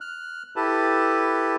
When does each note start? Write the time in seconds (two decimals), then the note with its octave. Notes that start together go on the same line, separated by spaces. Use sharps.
0.01 F6 F#6
0.56 E4 G4 A4 B4 A5